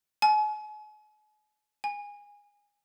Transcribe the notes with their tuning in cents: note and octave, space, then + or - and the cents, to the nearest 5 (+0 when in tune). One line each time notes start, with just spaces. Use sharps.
G#5 +40
G#5 -20